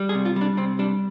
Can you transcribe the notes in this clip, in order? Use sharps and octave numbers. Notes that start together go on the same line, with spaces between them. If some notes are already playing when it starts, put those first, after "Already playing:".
Already playing: G3
G#4
C3
F4
G3
D4
C3 C4
G3 D4